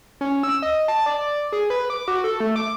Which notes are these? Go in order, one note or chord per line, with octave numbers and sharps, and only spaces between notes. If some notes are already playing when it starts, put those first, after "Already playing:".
C#4
E6
D#5
A5
D5
G#4
B4
D6
F#4
A4
A3
D6